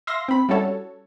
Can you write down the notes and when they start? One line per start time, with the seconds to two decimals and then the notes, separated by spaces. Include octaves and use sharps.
0.07 E5 F5 C6 A#6
0.28 C4 B5
0.49 G3 C#4 E4 F#4 A4 C#5